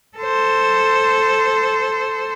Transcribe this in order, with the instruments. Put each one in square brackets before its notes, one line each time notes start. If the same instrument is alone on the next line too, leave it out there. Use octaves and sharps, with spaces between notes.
[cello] A4 C5